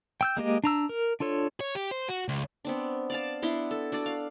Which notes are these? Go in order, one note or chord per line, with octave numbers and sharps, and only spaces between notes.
G5 E6 G6
G#3 A#3 G4 D#5
D4 A#5 E6
A#4
D4 F4 A4 C#5
C#5
G4
C5
F#4
C#2
B3 C4 D4
D5 F5 A5
B3 D4 E4 C6
A4
D4 F#4 D5
F5